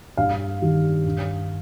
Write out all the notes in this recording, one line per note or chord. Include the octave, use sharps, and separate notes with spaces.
G2 F5
D#3 G3
G2